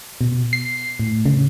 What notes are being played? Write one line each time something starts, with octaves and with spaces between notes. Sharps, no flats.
B2
C7
A2
C#3